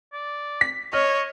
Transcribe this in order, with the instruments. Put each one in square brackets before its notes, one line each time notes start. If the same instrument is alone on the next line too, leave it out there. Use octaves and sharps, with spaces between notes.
[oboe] D5
[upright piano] B6
[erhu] C#5 [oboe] D#5 [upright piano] F6